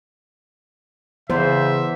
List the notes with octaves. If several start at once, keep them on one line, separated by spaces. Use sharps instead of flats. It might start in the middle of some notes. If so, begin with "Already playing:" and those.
E2 C#3 C5 E5